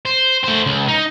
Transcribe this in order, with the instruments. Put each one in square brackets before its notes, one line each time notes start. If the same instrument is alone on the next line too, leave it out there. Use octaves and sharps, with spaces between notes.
[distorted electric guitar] C5
A3 C5
C#2
D#4